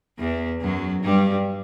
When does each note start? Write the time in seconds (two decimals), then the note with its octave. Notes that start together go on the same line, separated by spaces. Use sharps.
0.19 E2 E3
0.62 F#2 F#3
1.03 G2 G3